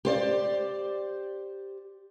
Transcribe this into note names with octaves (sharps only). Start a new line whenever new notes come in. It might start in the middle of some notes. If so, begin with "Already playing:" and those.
G4 C5 D5